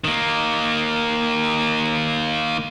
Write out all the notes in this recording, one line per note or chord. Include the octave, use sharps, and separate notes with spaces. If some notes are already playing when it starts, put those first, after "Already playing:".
D#3 A#3